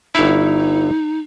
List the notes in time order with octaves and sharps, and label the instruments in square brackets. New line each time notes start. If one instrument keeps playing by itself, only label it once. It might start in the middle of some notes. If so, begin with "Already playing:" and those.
[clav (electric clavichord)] G1 E4 [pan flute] D#4